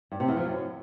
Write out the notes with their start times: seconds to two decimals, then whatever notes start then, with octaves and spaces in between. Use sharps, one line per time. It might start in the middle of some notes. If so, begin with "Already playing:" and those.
0.11 G2
0.20 C3
0.29 E2
0.37 F3
0.46 F#2